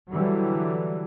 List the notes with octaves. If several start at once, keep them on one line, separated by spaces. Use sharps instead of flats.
D3 E3 F#3 G3